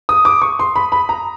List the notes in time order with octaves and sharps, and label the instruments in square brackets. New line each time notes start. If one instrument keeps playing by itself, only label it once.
[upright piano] D#6
D6
C#6
C6
B5
B5
A#5